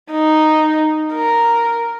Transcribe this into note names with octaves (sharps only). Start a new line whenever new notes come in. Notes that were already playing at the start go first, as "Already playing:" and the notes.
D#4
A#4